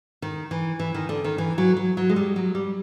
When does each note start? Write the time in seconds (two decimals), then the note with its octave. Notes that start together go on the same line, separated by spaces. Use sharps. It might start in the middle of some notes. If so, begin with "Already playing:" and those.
0.22 D#3
0.51 E3
0.79 E3
0.94 D#3
1.09 D3
1.24 D#3
1.38 E3
1.58 F#3
1.77 F#3
1.97 F#3
2.10 G#3
2.16 G3
2.36 F#3
2.55 G3